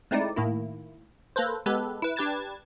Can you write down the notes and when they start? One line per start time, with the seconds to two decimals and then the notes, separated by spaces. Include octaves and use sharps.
0.11 G#3 A3 C4 D#4 E4 D5
0.36 A2 D#3 A#3 E4
1.36 A#3 A4 B4 C5
1.66 G#3 B3 G4 A4 B4
2.02 E4 B4
2.16 D4 G4 B4 G#6 A6 E7